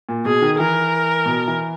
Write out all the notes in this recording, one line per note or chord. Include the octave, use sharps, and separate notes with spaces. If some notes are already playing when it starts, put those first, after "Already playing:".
A#2
B2 G#4
D#3
E3 A#4
B2
E3